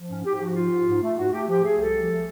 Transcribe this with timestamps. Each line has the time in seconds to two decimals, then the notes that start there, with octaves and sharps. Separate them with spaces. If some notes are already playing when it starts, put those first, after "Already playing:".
Already playing: F3
0.09 G#2 C#4
0.24 G#2 G4
0.34 G4
0.40 F3 F#4
0.55 G#2 F4
0.70 G#2
0.86 G#2
1.01 A3
1.17 G#2 F#4
1.32 A3 G4
1.48 F3 G4
1.63 A3 G#4
1.79 C2 A4
1.94 F3
2.09 A3